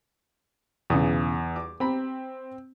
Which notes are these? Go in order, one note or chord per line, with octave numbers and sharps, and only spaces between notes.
B1 E2 C#3 D#6
D6
C4 G4 A#5 B5